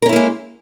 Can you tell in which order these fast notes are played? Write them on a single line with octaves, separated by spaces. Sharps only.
A#4 C#4 E4 A#3 G#3